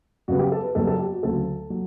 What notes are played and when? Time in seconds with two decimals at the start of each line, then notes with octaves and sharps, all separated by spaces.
0.28 F#2 C#3 G3 B3 F#4
0.39 G4
0.52 A4
0.63 B4
0.75 F#2 C#3 G3 B3 A4
0.87 A4
0.99 G4
1.12 F#4
1.23 D2 C#3 F#3 A4
1.70 F#3